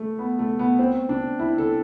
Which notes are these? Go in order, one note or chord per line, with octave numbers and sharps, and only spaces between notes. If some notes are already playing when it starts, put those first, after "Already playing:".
Already playing: A3
B3
A3
B3
C4
D4
E4
A4